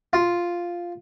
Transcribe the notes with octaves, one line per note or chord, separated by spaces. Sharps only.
F4